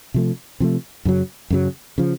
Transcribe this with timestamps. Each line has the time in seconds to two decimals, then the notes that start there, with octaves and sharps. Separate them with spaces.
0.14 C3 F3 A3
0.60 C3 F3 A3
1.05 F#2 C#3 F#3
1.50 F#2 C#3 F#3
1.98 C#3 F3